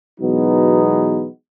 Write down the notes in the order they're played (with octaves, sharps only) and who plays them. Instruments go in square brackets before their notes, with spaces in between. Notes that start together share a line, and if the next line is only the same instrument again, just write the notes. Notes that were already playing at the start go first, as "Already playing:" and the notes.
[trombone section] B2 E3 F#3 G#3 B3 D#4